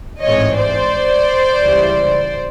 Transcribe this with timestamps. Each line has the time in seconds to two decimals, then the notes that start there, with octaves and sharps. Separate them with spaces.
0.23 A1 G#2 E3 G#3 C4 C#5 D#5
0.57 C5 D5
1.60 C#2 C#3 E3 G3